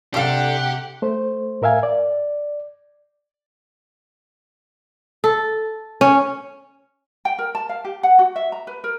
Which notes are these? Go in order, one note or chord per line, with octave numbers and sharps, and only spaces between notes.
C3 D4 G4 A4 F#5
A3 C5
A2 A#4 E5 F5 G#5
D5
A4
C#4
G5
A#4
A5
F5
G4
F#5
F#4
E5
A#5
B4
A#4